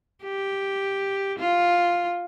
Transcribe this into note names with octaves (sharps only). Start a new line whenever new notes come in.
G4
F4